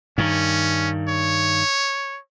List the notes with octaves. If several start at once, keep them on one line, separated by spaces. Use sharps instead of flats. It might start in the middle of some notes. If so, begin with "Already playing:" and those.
G2 D#3 C#4
C#5